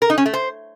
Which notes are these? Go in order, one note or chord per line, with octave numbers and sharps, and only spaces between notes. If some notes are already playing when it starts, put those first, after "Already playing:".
A#4
D#4
C#4
A3
C5